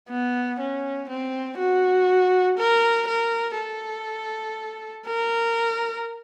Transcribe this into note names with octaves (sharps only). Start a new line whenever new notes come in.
B3
C#4
C4
F#4
A#4
A#4
A4
A#4